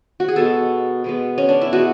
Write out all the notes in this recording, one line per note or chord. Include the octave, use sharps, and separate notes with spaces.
F#4
G#4
B2 G#3 B3 A4
B2 G#3 B3
C#4
D4
E4
B2 G#3 B3 F#4